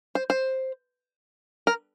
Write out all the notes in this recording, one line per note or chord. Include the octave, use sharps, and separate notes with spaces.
C5
C5
A#4